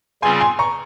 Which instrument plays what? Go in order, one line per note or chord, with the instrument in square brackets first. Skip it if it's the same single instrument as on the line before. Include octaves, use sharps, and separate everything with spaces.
[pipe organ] C#3 G3 C4 F4 G#4 [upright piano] G#5 C6
[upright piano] G#5 C6
A#5 C#6